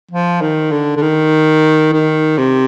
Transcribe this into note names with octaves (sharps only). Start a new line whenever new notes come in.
F3
D#3
D3
D3
D#3
D#3
C3